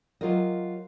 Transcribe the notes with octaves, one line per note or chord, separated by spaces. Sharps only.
F#3 F4 G4 A#4 D#5